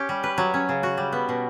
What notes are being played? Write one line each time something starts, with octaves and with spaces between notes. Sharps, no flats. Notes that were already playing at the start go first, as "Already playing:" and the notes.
Already playing: C#4 G4
G3
B4
F#3
C#4
C#3
F#4
G3
B3
B2